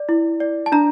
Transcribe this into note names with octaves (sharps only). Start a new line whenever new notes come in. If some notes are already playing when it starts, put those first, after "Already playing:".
Already playing: D5
E4
D5
A5
D4 A#5